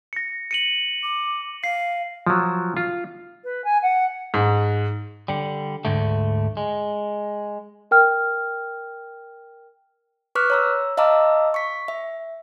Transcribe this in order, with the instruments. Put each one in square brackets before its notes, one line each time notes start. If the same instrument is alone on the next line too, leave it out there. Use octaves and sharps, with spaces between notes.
[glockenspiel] A#6 C#7
C#7 D#7 F#7
[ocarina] D6
[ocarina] F5 [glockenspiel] C7
[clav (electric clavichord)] F3 F#3
F4
[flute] B4
G#5
F#5
[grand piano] G#2
[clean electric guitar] D3 G3
D2 G#2 D3 A3
G#3
[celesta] A#4 G5 F6
[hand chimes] B4 C#6 D6 F6 F#6 B6
C#5 A#5 E6
D#5 F5 A5 A#5 D6 E6
C#6 B6
E5